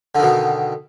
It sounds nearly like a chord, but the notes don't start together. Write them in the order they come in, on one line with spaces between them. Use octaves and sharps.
D3 D#3 B2